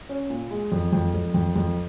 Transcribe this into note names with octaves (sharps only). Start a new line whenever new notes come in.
C#4
A#2
G#3
F2
F2
F2
F2
F2